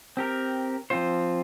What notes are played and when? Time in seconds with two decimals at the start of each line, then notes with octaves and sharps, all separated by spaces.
0.17 C4 G4 A#4
0.90 F3 C4 F4 C5